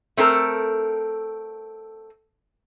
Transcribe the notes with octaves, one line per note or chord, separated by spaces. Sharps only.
A3 C4 A4 A#4